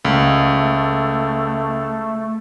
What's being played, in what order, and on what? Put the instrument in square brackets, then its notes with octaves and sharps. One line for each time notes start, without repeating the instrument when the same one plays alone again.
[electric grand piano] C#2 [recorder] A3